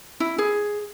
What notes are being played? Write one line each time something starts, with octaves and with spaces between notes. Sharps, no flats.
E4
G#4